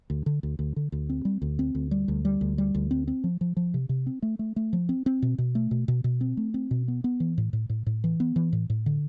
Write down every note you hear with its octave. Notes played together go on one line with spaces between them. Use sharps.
D2
D3
D2
D2
D3
D2
C4
G3
D2
C4
D2
G3
D2
G3
D2
G3
D2
C4
C4
F3
F3
F3
C3
C3
C4
A3
A3
A3
F3
C4
C4
B2
B2
A3
B2
B2
B2
C4
A3
C4
B2
B3
B3
E3
A2
A2
A2
A2
E3
B3
E3
A2
A2
D3